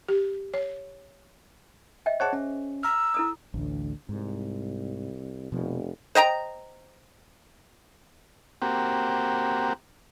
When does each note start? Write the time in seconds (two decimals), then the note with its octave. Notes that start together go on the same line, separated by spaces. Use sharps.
0.09 G4
0.54 C#5
2.06 D#5 E5 G5
2.20 G#4 C5 C#5 F#5 A5
2.33 C#4
2.83 A#5 E6 F6
3.14 E4 A4 D#6
3.54 A1 D2 D3
4.09 C2 G#2
5.52 F1 B2 F3
6.15 C5 D#5 G5 A#5
8.62 A#3 C4 F#4 G4